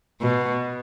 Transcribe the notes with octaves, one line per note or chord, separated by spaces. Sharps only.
B2